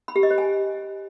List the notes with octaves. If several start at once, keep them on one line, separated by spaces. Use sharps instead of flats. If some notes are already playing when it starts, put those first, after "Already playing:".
B5
G4
D#5
C5
G#5